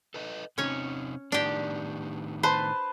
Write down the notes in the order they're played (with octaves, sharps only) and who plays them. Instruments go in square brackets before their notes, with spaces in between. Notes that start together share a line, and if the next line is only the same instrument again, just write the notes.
[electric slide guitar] A4 B4 D#5
[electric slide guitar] C3 C4 D#4 [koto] C#4 C#5
[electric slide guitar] A2 D#3 B3 [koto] D4 G4
[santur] B4 A5 C6 [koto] C5